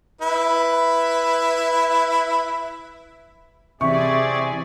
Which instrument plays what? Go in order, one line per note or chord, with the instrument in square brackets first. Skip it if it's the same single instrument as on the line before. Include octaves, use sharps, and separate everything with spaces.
[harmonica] E4 B4
[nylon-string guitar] C3 E3 [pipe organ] C4 G#4 D5 [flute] E5 [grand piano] C#6